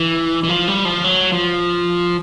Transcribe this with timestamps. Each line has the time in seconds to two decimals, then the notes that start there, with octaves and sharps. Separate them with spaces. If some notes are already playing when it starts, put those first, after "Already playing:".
Already playing: E3
0.43 E3
0.49 F3
0.68 G3
0.85 F3
1.04 F#3
1.32 F3